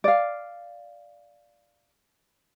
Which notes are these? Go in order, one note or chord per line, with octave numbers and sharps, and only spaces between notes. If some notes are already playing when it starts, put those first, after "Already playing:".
D5 F5